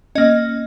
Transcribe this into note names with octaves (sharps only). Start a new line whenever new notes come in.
A#3 C#4 D#5